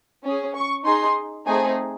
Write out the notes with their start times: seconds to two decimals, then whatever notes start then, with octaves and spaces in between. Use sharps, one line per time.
0.24 C#4 G#4
0.54 C#6
0.85 D#4 G#4 C6
1.46 A3 C4 D#4 G#4 G#5